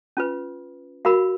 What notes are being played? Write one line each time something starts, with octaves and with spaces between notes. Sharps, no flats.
C#4 F4 B4
F#4 A#4 F5 B5